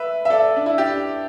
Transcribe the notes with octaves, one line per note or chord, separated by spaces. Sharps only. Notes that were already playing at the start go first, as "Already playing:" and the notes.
Already playing: B4 E5
E5
A4 D5
D4
E4
D4 G4